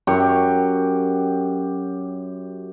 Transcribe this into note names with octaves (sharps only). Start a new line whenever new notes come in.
F#2 G4 C#6